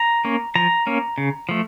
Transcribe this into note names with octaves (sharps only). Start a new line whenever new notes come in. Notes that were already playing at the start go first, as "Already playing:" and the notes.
Already playing: A#5
A#3 C#4
F3 A#5
A#3 C#4
C#3
F3 A3